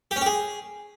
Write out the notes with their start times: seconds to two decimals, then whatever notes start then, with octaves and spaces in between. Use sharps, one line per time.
0.11 G4
0.16 C#4
0.21 G4
0.26 G#4